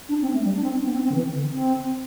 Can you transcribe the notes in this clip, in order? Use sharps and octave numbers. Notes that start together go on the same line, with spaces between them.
D4
C4
A3
G3
D4
C4
D4
B3
C4
C4
D3
E3
D3
C4